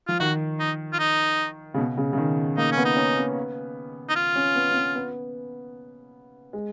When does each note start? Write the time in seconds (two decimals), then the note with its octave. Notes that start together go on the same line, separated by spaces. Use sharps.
0.08 F3 F4
0.20 D#3 F#4
0.59 D#4
0.93 F4
0.99 D#4
1.74 C#3
1.78 B2
1.97 C#3
2.13 C#3
2.17 D#3
2.57 A#3 D#4
2.71 C#4
2.77 B3
2.85 D#4
2.96 C#4
3.17 B3
4.09 D#4
4.16 F4
4.35 C#4
4.55 B3
4.70 C#4
4.76 B3
4.95 B3
6.53 G#3